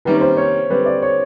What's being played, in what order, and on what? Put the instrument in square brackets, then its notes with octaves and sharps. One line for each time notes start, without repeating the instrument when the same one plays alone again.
[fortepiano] C3 D#3 G3 A#3 C#4 [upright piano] B4
[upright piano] C5
C#5
[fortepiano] D3 G3 C4 [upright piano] B4
[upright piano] D5
C#5